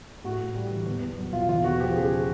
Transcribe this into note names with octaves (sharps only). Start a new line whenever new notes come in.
A2 F#4
A2
G3
E3
E2
E2
F#3
B2 F4
E2 F4
E2 F#4
F3 G4
C#3 G#4